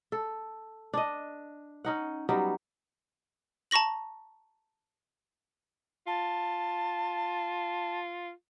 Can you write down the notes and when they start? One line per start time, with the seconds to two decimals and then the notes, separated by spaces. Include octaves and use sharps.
0.12 A4
0.93 D4 D#5
1.85 C#4 D#4 F#5
2.29 F#3 G3 B3 D#4
3.71 A5 A#5 C#6 A#6 F#7
6.07 F4 A5